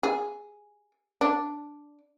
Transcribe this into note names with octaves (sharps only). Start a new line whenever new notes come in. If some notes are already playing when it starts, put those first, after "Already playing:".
G#4
D4